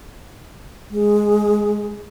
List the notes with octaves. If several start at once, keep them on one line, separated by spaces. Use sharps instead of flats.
G#3